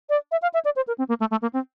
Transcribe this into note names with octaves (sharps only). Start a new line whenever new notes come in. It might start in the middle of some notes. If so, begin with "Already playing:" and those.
D5
E5
F5
E5
D5
C5
A#4
C4
A#3
A3
A3
A#3
C4